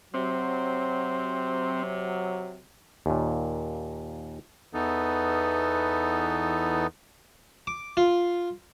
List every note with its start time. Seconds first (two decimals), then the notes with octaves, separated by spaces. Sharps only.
0.14 C3 F#3 C4
3.06 D#2 A#2
4.74 E2 E3 B3 D#4 A4
7.67 D6
7.97 F4